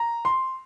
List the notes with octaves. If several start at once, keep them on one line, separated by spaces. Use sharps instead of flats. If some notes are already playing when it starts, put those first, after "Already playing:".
Already playing: A#5
C6